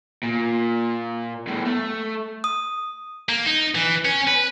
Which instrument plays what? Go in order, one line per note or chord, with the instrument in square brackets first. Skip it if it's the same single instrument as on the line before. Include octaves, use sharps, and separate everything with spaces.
[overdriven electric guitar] A#2
E2 A2
A3
[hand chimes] D#6
[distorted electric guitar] A#3
D#4
E3
C#4
B4